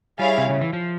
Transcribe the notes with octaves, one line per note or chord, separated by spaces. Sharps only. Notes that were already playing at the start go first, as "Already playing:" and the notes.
G3 E4 G#4 C#5 F5
C3
C#3
E3
F3